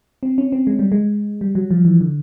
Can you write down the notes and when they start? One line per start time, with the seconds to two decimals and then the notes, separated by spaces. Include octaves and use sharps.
0.23 C4
0.38 C#4
0.52 C4
0.67 G#3
0.79 G3
0.92 G#3
1.41 G3
1.55 F#3
1.71 F3
1.85 E3
2.01 D3